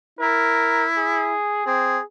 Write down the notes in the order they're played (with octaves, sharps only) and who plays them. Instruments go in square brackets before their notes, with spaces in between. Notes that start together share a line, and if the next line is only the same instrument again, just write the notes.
[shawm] E4 [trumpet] A#4
[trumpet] G#4
[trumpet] C4 [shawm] G#4